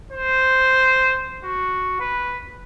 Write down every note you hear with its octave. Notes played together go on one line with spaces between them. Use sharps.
C5
F#4
B4